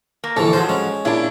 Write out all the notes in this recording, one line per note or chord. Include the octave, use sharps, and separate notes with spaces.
A#3
A#1 D3 E3 A4
G#2 F3 F#3 C5
G#3 C#4
A#2 C#3 D4 E4